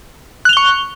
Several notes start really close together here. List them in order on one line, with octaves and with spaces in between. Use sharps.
F#6 F7 G7 C#6